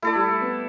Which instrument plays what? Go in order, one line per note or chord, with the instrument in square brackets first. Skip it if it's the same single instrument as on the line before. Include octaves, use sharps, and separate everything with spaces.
[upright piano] A3 [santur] E4 A4 D5
[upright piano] G3
A3
B3